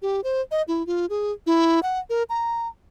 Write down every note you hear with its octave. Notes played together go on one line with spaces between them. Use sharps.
G4
C5
D#5
E4
F4
G#4
E4
F#5
A#4
A#5